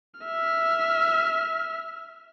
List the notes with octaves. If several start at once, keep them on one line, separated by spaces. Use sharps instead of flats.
E5 F6